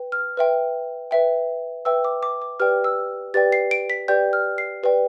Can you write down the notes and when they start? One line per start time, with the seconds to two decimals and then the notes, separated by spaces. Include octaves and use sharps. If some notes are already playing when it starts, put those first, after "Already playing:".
Already playing: B4 G5
0.12 F6
0.37 B4 E5 G5
1.11 B4 E5 G5
1.85 B4 E5 G5 E6
2.04 D6
2.23 D6
2.42 D6
2.60 G4 B4 D5 G5 F6
2.84 E6
3.34 G4 B4 D5 G5 A6
3.52 C7
3.71 D7
3.90 B6
4.08 G4 B4 D5 G5 G6
4.33 F6
4.58 C7
4.83 G4 B4 D5 G5